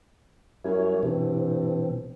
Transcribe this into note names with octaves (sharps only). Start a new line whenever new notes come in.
F#2 G3 E4 C#5
G2 B2 E3 C4